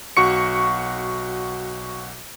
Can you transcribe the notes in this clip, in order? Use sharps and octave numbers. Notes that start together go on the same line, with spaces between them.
B1 F#4 C#6 C#7